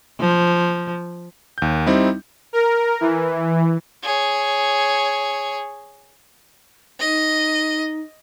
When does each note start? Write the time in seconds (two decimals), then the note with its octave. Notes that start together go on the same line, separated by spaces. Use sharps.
0.20 F3
1.58 D#2 G6
1.86 G3 C4 D#4 E4
2.53 A#4
3.01 E3
4.03 G#4 C#5
7.00 D#4 D#5